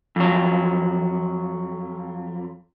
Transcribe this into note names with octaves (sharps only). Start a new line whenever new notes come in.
F2 F#3